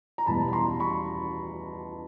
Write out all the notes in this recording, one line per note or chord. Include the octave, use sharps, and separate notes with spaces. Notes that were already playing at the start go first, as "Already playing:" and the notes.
A#5
E2 B2 G3 A5 B5
B5
A#5 C6
B5 C#6